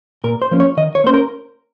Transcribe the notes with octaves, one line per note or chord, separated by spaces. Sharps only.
A#2 A#4
C5
F3 A#3 C#4
C#5
D#3 D#5
C#5
A#3 C#4 C5
A#4